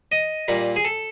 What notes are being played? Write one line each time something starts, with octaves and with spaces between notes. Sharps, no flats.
D#5
A#2 G3 A#3
G#4
A4